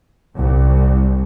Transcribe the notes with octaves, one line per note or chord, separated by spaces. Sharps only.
C2